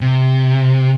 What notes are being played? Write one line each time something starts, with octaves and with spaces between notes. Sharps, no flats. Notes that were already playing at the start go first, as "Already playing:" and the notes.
C3